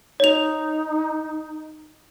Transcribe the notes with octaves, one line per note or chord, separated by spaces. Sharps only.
D#4 C#5 F7